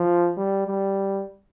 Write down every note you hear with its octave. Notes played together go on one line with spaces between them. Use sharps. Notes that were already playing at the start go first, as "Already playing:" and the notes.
Already playing: F3
G3
G3